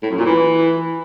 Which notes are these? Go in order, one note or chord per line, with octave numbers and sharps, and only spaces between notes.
A2
F#2
A#2
E3